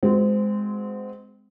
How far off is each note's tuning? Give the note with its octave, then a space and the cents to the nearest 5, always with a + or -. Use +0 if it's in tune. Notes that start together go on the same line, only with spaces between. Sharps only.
G#3 +0 C4 -25 F#4 -20